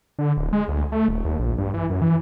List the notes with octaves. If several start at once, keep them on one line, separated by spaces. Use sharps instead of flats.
D3
D1
G#3
D2
A3
D#1
D#2
A#1
G2
E3
F#2
E3